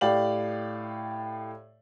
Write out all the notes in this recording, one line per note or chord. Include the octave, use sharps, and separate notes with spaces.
A2 G4 D5 F5 F#7